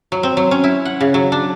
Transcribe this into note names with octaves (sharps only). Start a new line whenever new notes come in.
F#3
C4
F#3
C#4
E4
F#5
C#3
F#3
D4